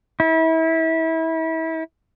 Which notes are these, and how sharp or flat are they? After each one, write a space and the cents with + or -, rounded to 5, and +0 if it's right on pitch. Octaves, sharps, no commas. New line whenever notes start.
E4 -30